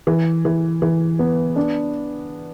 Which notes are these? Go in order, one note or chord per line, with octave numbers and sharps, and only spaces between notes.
E3
E3
E3
B3
D4